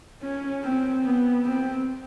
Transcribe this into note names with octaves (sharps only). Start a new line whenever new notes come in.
C#4
C4
B3
C4